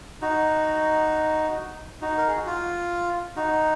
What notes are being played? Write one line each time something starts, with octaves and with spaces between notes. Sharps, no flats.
D#4 F#4
D#4 F#4
A#4
G#4
F#4
F4
D#4 F#4